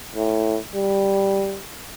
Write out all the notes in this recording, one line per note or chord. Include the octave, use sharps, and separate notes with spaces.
A2
G3